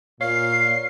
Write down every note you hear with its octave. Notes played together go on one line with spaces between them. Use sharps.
A#2 C#5 F5 C7